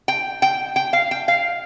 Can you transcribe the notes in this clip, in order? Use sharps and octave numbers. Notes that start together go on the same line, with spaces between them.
G5
G5
G5
F5
G5
F5